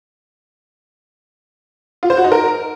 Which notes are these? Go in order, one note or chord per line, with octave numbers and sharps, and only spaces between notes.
F4
C5
F#4
D#4
A#4